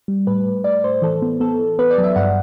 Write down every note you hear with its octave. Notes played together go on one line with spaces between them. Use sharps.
G3
A2 B4
A2
A2 D5
A2 C5
E3 A4
B3
B3 A4
E3
B3 B4
D5
F#3
E5
G2 F#5